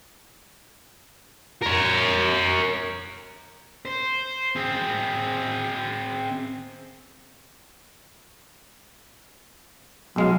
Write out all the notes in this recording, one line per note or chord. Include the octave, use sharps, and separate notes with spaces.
A#4 C#5
C5
C4 G#4
B1 F#3 G#3 F5